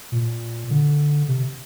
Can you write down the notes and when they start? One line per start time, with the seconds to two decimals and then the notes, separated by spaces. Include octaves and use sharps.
0.12 A#2
0.70 D3
1.28 C3